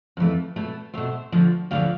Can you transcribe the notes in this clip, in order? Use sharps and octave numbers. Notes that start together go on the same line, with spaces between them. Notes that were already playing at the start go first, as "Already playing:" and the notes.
F2 E3 A3
B2 A3
B2 A3 C5 E5
D2 D3 F3
D2 D3 F3 D5 F5